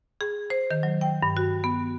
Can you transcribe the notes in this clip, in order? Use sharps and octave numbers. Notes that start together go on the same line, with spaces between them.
G#4
C5
D#3
F#3
G5
G2
F#4
B3